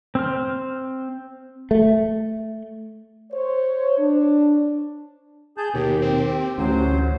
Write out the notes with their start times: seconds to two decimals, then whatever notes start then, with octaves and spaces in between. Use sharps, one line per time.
0.15 C4 C5 F6
1.71 A3
3.32 C5 C#5
3.97 D4
5.57 G#4 A5 G6
5.74 D#2 B2 G4
6.02 C4
6.58 A1 D2 F#3 C5